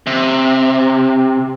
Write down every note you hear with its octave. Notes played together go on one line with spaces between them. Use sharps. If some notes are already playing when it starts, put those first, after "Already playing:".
C3